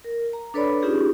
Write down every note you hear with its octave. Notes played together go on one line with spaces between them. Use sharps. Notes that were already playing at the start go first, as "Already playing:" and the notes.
A#4
A#5
D4 A4 B4 C#5 D5 B5
C#4 D#4 F4 G4 G#4